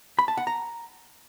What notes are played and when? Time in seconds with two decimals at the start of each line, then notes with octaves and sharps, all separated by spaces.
0.19 B5
0.28 A5
0.37 F#5
0.47 A#5